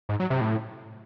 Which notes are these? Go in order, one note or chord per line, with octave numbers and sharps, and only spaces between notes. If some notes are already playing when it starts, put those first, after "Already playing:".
G#2
F#3
C3
A2